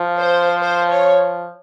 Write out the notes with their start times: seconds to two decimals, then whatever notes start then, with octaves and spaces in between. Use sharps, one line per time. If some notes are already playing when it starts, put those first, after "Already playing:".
Already playing: F3
0.19 C5
0.61 C5
0.90 C#5